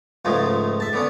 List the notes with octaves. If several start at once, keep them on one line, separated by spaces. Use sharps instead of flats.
C#2 G#2 F3 G#3 A3
E5 A5
D3 B3 C#4